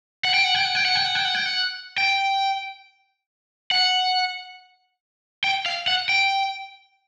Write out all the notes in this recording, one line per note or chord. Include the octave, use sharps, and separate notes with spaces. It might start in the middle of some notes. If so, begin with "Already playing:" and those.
F#5
G5
F#5
G5
F#5
G5
F#5
G5
F#5
G5
F#5
G5
F#5
G5
F#5
G5
F5
F#5
G5